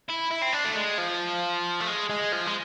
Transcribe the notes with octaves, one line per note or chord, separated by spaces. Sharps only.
E4
E4
C4
D4
A3
G#3
F3
A3
G#3
G#3
F3
G#3